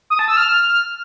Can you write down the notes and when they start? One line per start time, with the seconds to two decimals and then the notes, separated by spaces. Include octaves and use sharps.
0.10 D#6
0.19 A5
0.28 E6
0.37 F6